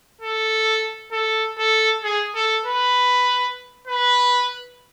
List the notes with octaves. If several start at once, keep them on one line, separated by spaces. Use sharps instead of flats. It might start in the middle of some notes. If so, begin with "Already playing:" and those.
A4
A4
A4
G#4
A4
B4
B4